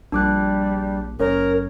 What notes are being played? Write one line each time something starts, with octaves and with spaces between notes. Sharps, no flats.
A#1 G3 D4 D6 F#6
F#1 C#4 A#4 C#5